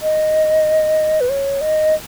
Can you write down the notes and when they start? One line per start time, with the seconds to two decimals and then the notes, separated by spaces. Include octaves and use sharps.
0.02 D#5
1.21 B4
1.29 C#5
1.61 D#5